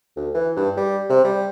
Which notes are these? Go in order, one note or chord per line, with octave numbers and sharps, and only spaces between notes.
D2
E3
G2
G3
C3
G3